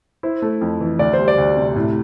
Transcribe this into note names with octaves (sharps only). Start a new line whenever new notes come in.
E4 C5
A3
F2
E3
D2 D5
C5
G3
D5
D2
C3
A2